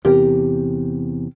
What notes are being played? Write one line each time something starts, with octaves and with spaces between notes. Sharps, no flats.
E2 C3 G4 A#4